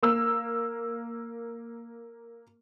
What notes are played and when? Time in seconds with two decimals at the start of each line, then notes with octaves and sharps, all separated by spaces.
0.03 A#3 E6